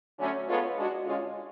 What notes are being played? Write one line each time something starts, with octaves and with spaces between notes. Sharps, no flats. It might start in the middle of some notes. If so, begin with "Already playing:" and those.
D3 F#3 A3 C#4
G#3 B3 F4 A4 C#5
G#3 D4 F#4
D3 G#3 C#4 F4